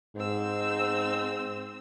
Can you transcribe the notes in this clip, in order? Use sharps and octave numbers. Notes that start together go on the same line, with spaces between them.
G#2 C4 E6